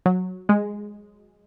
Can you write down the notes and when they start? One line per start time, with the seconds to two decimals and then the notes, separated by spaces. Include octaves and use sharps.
0.06 F#3
0.49 G#3